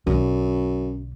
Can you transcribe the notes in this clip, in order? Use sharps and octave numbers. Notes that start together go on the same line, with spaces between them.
B1 F#2 D3